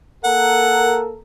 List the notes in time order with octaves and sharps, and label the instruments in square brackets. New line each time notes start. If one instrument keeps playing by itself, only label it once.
[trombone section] A#3 A4 A#4 [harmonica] F#5